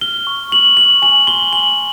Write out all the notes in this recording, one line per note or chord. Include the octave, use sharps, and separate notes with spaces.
F6 G7
C#6
C#6 F#7
C#6 F#7
G#5 F#7
C6 G7
G#5 F#7